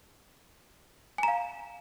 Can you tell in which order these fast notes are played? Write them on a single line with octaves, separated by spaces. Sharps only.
G#5 A#5 F5